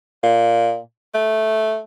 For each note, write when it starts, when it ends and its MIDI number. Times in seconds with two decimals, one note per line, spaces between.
0.23 0.78 46
1.14 1.80 57